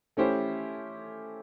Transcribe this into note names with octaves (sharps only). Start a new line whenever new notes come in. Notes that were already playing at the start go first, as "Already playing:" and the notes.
A3 C#4 E4 G4 C5